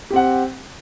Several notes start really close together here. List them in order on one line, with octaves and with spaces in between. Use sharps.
G4 C4 F#5